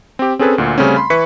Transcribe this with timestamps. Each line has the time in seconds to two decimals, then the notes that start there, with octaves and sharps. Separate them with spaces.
0.19 C4 G4
0.39 C4 C#4 G#4 A4 B4
0.58 D2 A#2
0.78 C#3 G3 A3 C4 C#4
0.96 B5 C6
1.10 E3 E4 B4 C#6 B6 C#7